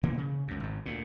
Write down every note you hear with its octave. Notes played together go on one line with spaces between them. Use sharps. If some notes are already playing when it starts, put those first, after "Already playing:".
B2 E3 A#3 B3
C#3
C#2 F#2
G#1 G#2
D2 A#2